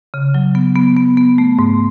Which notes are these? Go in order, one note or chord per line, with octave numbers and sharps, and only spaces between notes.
C#3
F#3
B3
B3
B3
B3
A3
G#2